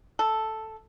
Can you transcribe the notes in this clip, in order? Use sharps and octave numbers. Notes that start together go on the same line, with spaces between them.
A4